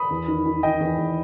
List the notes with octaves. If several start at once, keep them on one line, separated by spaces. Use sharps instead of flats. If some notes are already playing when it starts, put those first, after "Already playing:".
Already playing: B5 D#6
E2
D#3
D#3
D#3 D#5 G5
E2
E2